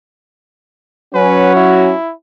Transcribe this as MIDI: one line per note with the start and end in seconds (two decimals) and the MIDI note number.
1.14 1.92 54
1.14 1.92 61
1.14 1.92 66
1.14 1.55 71
1.55 2.12 64